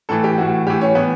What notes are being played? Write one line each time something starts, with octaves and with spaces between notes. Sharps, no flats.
A2 E3 A4
G4
A2 E3 F#4
A2 E3 G4
C#4
A2 E3 B3